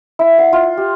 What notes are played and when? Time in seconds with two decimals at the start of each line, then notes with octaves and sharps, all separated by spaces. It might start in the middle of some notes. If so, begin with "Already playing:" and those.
0.19 E4
0.38 F#5
0.53 F4
0.77 G4